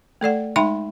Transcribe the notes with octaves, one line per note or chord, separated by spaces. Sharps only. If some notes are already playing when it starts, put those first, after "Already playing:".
A3 A4 D5 F#5
G#3 D#4 E5 G5 B5 C6